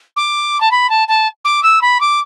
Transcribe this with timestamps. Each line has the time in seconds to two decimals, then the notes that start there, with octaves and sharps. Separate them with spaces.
0.16 D6
0.60 A5
0.71 B5
0.89 A5
1.08 A5
1.45 D6
1.63 E6
1.81 B5
2.00 D6